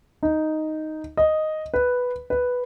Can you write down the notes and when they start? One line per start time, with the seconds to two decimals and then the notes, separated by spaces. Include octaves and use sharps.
0.23 D#4
1.17 D#5
1.74 B4
2.30 B4